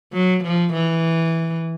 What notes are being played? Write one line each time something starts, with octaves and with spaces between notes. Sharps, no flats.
F#3
F3
E3